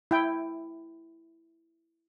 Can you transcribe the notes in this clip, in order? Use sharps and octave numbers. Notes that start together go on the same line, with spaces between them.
E4 G5